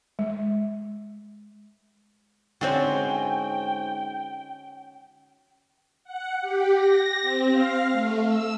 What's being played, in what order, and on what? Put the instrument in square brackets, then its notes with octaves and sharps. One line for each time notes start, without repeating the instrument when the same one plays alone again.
[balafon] G#3
[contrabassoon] G#2 [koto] D3 C4 [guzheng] C#4 F#4 [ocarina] G5
[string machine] F#5
G4
A#6
C4
F5
A3
E6